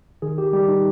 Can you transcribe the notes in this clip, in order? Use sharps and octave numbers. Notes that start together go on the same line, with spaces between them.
D#3 G#4
G4
G3 G4
D#4